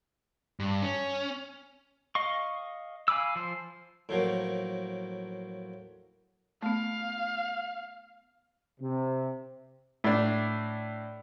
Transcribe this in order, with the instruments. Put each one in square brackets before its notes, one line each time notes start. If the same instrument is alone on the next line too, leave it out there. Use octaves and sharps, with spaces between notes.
[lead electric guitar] G2
C#4
[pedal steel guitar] D#5 F5 C#6
F5 G#5 B5 D6 E6
F3 C5
[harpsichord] A2 F3 F#3 A#3
[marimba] A3 B3 [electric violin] F5
[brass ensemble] C3
[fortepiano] A2 D4